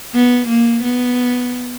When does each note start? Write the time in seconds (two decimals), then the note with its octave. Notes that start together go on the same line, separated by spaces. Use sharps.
0.14 B3
0.48 A#3
0.83 B3